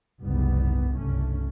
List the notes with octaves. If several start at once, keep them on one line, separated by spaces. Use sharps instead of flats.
F#1 C2 G#2 G3 B3
F#1 C2 G2 A3 C#4